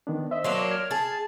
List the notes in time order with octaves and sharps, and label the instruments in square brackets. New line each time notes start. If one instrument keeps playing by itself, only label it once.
[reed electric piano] D#3 B3 D4
[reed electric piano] C5 D#5 [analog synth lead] E5
[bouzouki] F#3 A#3 D4 [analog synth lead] C6
[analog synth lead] F6 [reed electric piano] G#6
[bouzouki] G#4 [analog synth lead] A5